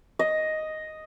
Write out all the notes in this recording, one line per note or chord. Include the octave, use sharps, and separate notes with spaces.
D#5